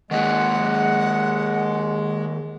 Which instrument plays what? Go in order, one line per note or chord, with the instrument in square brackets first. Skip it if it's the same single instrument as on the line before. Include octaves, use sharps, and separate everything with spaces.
[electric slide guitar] D#3 A#3 G#4 [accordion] G#3 [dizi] F#5